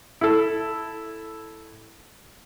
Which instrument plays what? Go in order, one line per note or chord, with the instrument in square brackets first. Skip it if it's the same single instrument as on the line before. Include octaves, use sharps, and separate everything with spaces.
[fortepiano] E4 A4